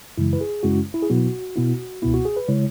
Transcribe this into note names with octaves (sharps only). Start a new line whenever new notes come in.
F#2 C#3 E3 G#3 E4
B4
G#4
F#2 C#3 G#3 C#4 E4 F#4
E4
G#4
B2 F#3 B3 E4 F#4
B2 B3 E4
C#2 B2 B3 E4
F#4
G#4
B4
C#3 G#3 E4 C#5